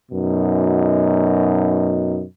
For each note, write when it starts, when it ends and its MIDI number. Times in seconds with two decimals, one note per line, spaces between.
0.12 2.23 42
0.12 2.23 47
0.12 2.23 63